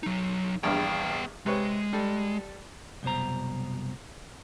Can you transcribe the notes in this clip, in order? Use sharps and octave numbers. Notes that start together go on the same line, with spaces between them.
F#3 D#4
A#1 E2 G2 B3 G5
C3 G#3 B4 C#5
G3 A4
C2 F#2 B2 C5 A#5